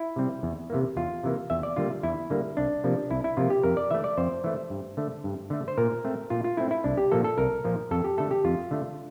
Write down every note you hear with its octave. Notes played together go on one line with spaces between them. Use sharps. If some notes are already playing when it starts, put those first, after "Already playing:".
Already playing: E4
C3 G3 C4
E2
C3 E3 A#3
E2 F4
C3 E3 A#3
E2 E5
D5
D3 G3 A#3 F4
E2 E4
D3 G3 A#3
C2 D4
C3 F3 A#3
C2 E4
E4
C3 F3 A#3 F4
G4
F2 A#4
D5
E3 A3 E5
D5
F2 C5
E3 A3
G2
D3 A3
G2
D3 A3
C5
A#2 A#4
A3 C4
A#2 F4
F4
A3 C4 E4
E4
C2 D4
G4
A#2 F3 A#3 A4
A4
C2 A#4
A#2 F3 A#3
F2 A4
G4
D3 A3 A4
G4
F2 F4
D3 A3